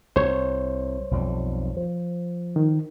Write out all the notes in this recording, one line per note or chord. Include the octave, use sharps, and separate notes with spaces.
C2 C5 C#5
B1 F2 G3
F3
D#3